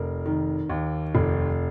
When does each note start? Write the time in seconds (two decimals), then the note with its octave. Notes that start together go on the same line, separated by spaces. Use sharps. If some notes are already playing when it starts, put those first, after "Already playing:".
Already playing: F1 A#4
0.26 D#3
0.70 D#2
1.15 F1